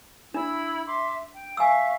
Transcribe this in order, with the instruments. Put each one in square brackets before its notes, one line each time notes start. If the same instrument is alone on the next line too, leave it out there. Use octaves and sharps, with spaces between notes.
[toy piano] D4 [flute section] E4 B5 E6
[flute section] E5 C6 D6
G5
[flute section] E5 F5 C#6 [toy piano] G#5 E6